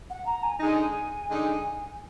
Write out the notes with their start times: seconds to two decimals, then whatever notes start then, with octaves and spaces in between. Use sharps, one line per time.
0.10 F#5
0.26 A#5
0.43 G#5
0.60 D3 G#3 D#4 G#5
1.28 D3 G#3 D#4